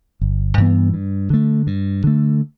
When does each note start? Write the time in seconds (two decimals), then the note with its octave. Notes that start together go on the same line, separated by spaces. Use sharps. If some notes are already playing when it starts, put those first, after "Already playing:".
0.21 G1
0.57 G2 E3 B3
0.94 G2
1.30 D3 A3
1.67 G2
2.04 D3 A3